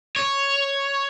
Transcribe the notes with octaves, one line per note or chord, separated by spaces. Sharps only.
C#5